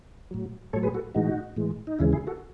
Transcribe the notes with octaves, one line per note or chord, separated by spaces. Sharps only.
A2 F#3
A2 F#3 A4 C#5
G#4 B4
F#4 A4
A2 E3 G#3 D#4 F#4
A2 E3 G#3
D#4
D#2 C#3 E3 G#3 C#4 E4
E4 G#4
F#4 A4